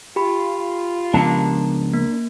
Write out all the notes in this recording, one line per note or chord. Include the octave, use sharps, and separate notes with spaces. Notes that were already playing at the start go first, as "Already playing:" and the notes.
F4 G4 B5
C#2 F3 B3 D4 A#4 A5
A#3